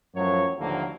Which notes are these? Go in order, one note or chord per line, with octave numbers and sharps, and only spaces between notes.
F#2 A2 F3 F#3 C#5
D#2 A2 D3 F3 F#3 A#3